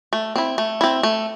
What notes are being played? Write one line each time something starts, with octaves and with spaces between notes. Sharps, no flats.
A3
C4 E4
A3
C4 E4
A3